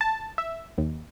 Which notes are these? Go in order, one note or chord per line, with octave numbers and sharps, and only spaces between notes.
A5
E5
D#2